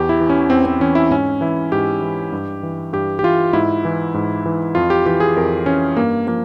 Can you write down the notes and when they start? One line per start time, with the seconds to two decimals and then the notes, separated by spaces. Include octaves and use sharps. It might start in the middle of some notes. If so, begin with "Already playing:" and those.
Already playing: E2 G4
0.09 E4
0.21 E3
0.29 C#4
0.50 E2 C4
0.66 C4
0.80 E3 C#4
0.95 E4
1.10 G#2 C#4
1.41 E3 E4
1.72 G#2 G4
2.02 E3
2.32 G2
2.63 E3
2.93 G2 G4
3.19 G4
3.23 E3 F4
3.53 G#2 E4
3.85 E3
4.14 G#2
4.46 E3
4.75 F2 F4
4.90 G4
5.06 E3 G4
5.20 G#4
5.37 F2 A#4
5.66 E3 C#4
5.96 G2 A#3
6.27 F3 A#3